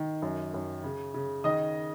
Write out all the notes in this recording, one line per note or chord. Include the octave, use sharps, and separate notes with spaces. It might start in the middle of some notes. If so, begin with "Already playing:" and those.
Already playing: D#3
F#2
F#2
C#3
C#3
D#3 D#5 D#6